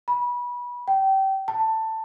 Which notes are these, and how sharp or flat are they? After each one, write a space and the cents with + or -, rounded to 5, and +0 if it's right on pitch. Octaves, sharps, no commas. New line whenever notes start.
B5 -25
G5 -25
A5 +15